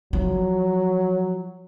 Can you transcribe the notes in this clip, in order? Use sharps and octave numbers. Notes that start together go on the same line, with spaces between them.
F3 F#3